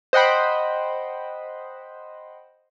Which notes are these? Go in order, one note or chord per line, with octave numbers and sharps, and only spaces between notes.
C5 D#5 F#5 G5 B5